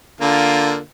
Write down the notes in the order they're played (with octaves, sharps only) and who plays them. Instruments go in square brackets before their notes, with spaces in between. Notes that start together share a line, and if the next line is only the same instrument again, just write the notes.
[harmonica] D3 A#3 F4